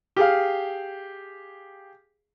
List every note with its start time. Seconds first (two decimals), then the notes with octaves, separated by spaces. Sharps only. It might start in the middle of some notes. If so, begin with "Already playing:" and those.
0.16 G4 G#4 F5